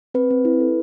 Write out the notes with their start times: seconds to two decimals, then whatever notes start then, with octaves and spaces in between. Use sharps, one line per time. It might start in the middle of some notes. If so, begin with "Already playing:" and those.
0.14 C4 B4
0.30 C4
0.45 E4
0.60 A4